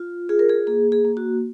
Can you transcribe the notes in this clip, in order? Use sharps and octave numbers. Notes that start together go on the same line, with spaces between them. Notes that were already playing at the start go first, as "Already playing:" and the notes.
Already playing: F4
F4 G#4
A#4
G#4
A#3 G#4
G#4
A#3
F#4